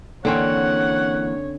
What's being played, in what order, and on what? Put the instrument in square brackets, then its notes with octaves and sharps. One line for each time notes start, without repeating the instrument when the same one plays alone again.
[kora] D3 C4 C#4 [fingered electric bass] E3 A#3 [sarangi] C#5 [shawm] F#5